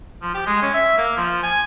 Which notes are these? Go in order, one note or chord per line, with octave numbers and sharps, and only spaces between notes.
F3
G4
G#3
C#4
E5
A#3
F3
G#5